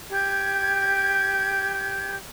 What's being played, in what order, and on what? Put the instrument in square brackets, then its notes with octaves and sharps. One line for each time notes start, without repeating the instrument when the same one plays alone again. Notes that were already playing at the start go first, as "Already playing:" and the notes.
[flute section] G4 G6 G#6